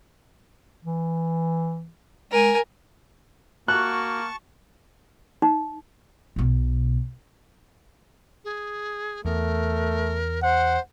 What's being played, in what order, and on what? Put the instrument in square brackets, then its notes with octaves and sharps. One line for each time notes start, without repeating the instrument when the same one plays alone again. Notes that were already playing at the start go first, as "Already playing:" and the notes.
[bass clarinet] E3
[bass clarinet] G#3 [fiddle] A#4 G#5
[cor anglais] A#3 [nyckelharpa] F#4 [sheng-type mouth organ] A5 C#6 [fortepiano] F#6
[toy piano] D#4
[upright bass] B1 B2
[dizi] G#4
[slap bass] E2 [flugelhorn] A3 [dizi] A#4
[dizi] C5 [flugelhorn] F#5